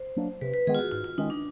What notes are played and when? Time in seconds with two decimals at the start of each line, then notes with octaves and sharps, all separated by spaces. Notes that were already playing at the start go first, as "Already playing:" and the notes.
Already playing: C5
0.16 F#3 A#3 D4
0.41 C3 B4
0.54 B4
0.67 D#3 G#3 B3 G#4
0.75 F4
0.79 F#4
0.92 G#2 F4
1.04 F4
1.18 D#3 G#3 C#4 D#4
1.30 D4